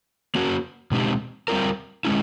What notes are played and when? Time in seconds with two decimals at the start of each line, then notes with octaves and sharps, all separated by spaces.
0.35 A#3 C#4 F#4
0.91 B2 G#3 C4 D#4 G4
1.48 G3 C4 F4 A#4
2.05 G#3 C#4 E4